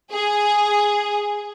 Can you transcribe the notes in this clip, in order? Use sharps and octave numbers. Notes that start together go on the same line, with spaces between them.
G#4